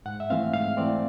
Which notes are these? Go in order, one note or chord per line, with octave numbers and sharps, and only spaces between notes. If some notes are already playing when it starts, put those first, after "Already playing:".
G#2 F#5
E5
E3 A3 C4 F5
G#2 F5
E3 A3 C4 D5